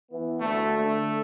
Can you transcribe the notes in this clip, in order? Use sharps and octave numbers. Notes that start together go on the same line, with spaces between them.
E3 B3
D2 A3
D3 A3